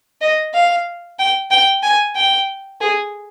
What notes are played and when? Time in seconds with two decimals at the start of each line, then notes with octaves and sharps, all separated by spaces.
0.21 D#5
0.54 F5
1.19 G5
1.51 G5
1.83 G#5
2.16 G5
2.81 G#4